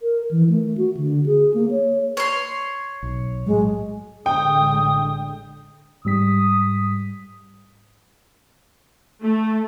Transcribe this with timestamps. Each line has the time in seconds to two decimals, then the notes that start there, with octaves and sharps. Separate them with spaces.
0.01 A#4
0.31 E3
0.49 A3
0.78 F#4
0.97 D3
1.26 G#4
1.54 A#3
1.71 C#5
2.17 C#5 C6
3.03 B1
3.46 A2 F#3 G#3
4.26 A1 D3 G#3 G5 D#6
6.05 G#2 G3 D#6 B6
9.21 A3